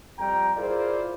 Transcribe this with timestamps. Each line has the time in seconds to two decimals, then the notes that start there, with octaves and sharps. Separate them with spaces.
0.18 F2 G3 G5 A#5
0.57 E4 F4 G#4 A#4 C5 D5